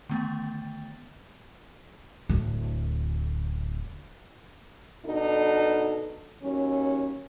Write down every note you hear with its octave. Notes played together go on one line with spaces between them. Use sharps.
D3 D#3 A3 B3 G5 A6
D1 D2
B2 D4 D#4 A4
D#2 F#3 C#4